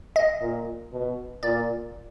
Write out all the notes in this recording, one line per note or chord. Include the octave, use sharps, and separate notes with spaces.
D#5
A#2
B2
A#2 D5